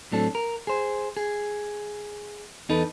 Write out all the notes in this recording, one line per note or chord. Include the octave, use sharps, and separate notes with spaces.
A2 F#3 C4 D4 A4
A#4
G#4 C5
G#4
E2 D#4 A4 B4